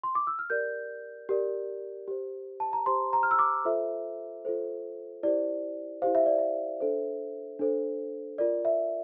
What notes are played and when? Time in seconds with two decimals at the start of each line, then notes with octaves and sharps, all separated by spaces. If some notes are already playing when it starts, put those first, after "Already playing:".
0.03 C6
0.15 D6
0.27 E6
0.39 F6
0.50 G4 A#4 D5 G6
1.29 G4 A#4 D5
2.08 G4 C5
2.60 A5
2.73 A#5
2.86 G4 C5 C6
3.13 A#5
3.23 F6
3.31 E6
3.39 D6
3.65 F4 A4 C5 E5
4.45 F4 A4 C5
5.23 E4 G4 C5 D5
6.02 E4 G4 C5 F5
6.15 E5
6.26 D5
6.38 E5
6.80 D4 A4 C5
7.59 D4 A4 C5
8.38 F4 A#4 D5
8.65 E5